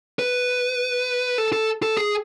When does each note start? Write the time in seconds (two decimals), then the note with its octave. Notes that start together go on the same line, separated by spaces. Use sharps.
0.19 B4
1.38 A4
1.53 A4
1.83 A4
1.97 G#4